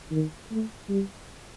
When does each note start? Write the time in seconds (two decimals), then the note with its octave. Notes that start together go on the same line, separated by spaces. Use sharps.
0.11 D#3
0.51 A3
0.90 G3